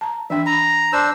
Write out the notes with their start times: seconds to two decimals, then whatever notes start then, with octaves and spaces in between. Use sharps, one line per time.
0.01 A5 A#5
0.30 E3 D4 E5 G5
0.46 A#5 B5
0.93 D4 C5 E6